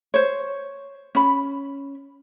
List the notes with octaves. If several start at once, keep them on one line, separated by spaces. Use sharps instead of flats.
C5 C#5
C#4 B5